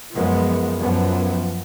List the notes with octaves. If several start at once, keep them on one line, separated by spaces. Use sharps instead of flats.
F#2 F3 G#3 B3
F#2 F3 B3